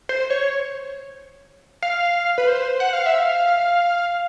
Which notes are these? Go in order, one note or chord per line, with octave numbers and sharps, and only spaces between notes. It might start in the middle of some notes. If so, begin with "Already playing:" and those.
C5
C#5
F5
B4
C5
F#5
F5
E5
F5